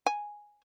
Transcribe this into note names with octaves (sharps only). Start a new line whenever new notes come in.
G#5